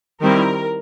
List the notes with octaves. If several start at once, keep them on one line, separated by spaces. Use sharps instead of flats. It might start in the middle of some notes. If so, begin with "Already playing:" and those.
D#3 G3 C4 E4 A#4